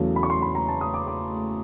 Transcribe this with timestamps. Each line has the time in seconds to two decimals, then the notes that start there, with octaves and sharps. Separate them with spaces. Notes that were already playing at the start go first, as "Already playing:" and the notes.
Already playing: E2 C#3 F#3 A3
0.16 B5
0.23 C#6
0.30 C6
0.42 B5
0.55 A#5
0.68 A5
0.81 D#6
0.94 D6
1.07 D6